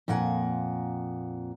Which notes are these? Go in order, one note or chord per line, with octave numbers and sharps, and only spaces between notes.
F2 A#2 A#3 F#5 G#5